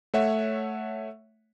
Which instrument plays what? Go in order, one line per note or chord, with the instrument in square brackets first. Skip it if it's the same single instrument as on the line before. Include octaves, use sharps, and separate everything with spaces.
[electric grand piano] A3 C#5 E5 F#5